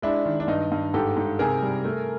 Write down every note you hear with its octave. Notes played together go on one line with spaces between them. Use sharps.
G#3 D4 E4
D#3
D4
G2 D#4
G2
G#2 G4 A4
G#2
C3 G#4 A#4
G3
A3